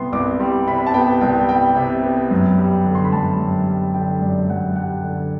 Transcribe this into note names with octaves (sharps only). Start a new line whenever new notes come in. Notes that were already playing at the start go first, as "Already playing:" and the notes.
Already playing: C2 C3 G3 B3 C6
C2 D6
G3 C6
C3 B5
A5
B3 G5
C2 G5
G3 G5
C3
B3
F#2
G3
D3
C6
B5
F#2 A5
F#2
G3
D3 G5
F#2 D5
F#2 F#5
G3 F#5
D3